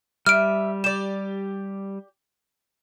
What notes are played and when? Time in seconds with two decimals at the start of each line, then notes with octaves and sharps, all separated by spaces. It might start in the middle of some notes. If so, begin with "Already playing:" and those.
0.26 G3 E5 F6 D7
0.84 G4 D5 E7